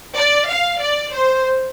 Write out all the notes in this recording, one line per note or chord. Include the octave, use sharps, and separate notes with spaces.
D5
F5
D5
C5